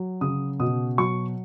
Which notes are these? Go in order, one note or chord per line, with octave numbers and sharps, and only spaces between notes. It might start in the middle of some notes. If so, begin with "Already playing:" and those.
Already playing: F#3
C#3 D#6
B2 D#6
F#3 C#6